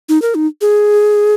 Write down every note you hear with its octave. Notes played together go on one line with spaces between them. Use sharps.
D#4
A#4
D#4
G#4